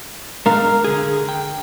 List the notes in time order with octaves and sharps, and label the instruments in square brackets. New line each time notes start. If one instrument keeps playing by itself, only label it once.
[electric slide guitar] G#3 D4 F5 [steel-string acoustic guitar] A#4
[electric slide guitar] D3 G#4
G5